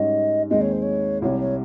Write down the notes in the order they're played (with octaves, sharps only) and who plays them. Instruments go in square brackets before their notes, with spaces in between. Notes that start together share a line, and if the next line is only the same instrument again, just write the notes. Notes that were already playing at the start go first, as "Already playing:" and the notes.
Already playing: [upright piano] G#2 G3 C#4 [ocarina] D#5
[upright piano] D#2 D#3 G#3 C4 D#4 [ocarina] D#5
[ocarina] C#5
C5
C#5
[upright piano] C2 C3 G3 [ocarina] C#5
[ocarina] C#5